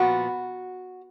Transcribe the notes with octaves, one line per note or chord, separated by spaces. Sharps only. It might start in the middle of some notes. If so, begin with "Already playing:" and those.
Already playing: A#2 F3 B3 F#4